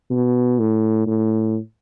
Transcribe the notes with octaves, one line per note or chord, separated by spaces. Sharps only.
B2
A2
A2